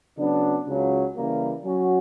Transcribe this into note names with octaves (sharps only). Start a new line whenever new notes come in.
C#3 F#3 B3 D4
C#2 C#3 F#3
C#3 E3 G3 A#3
F#3 C#4 F#4